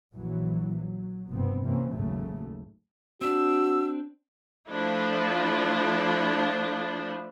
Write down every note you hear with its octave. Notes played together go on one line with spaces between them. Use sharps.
A#1 E3 F#3
F#3
F1 G2 B2 B3 C4
C3 E3 A#3 C4 C#4
G#1 D#2 G#2 C#3 F#3 A3
C4 D4 F#4 E6
F3 A3 D4 E4 F4